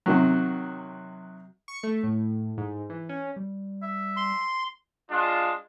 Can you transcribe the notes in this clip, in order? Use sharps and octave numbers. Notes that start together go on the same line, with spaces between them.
C3 D#3 F#3
C#6
A3
A2
G#2
E3
C#4
G3
E5
C6
G#3 D4 F4